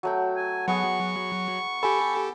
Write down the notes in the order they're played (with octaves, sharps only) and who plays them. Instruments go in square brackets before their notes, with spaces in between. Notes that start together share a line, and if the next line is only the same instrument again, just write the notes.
[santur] F#3 A3 G5
[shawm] G#5
[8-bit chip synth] F#3 [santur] B3 G#4 [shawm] C#6
[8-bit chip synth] G4 A4 [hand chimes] G#5 B5